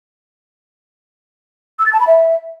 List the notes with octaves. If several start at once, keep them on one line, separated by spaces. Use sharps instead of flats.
E6
A6
A5
B5
E5